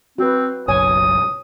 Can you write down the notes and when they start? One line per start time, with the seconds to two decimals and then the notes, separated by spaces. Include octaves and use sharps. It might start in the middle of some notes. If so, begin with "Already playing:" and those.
0.18 C4 F#4 B4
0.68 F#1 B1 C#5 G#5 D#6